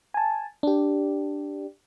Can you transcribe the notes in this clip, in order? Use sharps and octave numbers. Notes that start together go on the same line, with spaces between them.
G#5 A5
D4 G4